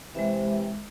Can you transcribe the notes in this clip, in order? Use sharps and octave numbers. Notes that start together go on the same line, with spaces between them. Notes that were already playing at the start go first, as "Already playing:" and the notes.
C3 E3 G#3 E5